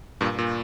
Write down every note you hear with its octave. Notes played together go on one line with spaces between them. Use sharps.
G2 A#2
A#2